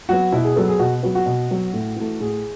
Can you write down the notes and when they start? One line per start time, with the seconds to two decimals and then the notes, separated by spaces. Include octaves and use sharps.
0.09 F#3 B3 F#4
0.32 B2 E4
0.44 G#4
0.56 F#3 B3 A4
0.68 G#4
0.79 B2 F#4
1.03 F#3 B3 F#4
1.15 F#4
1.26 B2
1.50 F#3 B3
1.73 A2
1.96 E3 A3
2.20 A2 G#4